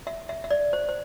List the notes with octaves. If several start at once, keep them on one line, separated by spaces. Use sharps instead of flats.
E5
E5
E5
D5
C5
C5